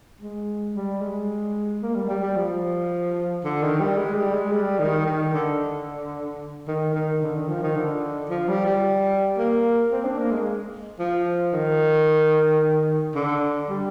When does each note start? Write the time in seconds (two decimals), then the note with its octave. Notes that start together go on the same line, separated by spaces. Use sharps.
0.20 G#3
0.74 G3
1.01 G#3
1.82 A#3
1.95 G3
2.09 G3
2.23 G3
2.36 F3
3.44 D3
3.62 D#3
3.80 G3
3.98 G#3
4.15 G3
4.33 G#3
4.52 G3
4.79 D#3
5.06 D#3
5.33 D3
6.67 D#3
6.94 D#3
7.22 D3
7.35 D#3
7.49 F3
7.62 D#3
7.76 D3
8.29 F3
8.48 G3
8.66 G3
9.38 A#3
9.92 C4
10.05 D4
10.18 A#3
10.31 G#3
10.99 F3
11.53 D#3
13.15 D3
13.69 G3